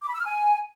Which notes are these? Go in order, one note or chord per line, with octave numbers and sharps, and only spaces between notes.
D6
B5
E6
F6
G#5